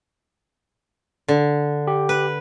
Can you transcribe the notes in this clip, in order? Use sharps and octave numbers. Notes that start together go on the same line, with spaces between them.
D3
G4
B4